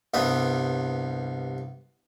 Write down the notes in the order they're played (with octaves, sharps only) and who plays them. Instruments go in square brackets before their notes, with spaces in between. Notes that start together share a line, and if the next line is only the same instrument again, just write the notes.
[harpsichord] C2 G2 G3 B3 B5 D#6